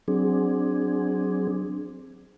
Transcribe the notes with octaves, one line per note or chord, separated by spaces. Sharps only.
F#3 C4 D4 G#4